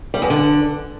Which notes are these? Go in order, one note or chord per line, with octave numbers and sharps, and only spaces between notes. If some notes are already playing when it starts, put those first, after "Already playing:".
G3
E2
D3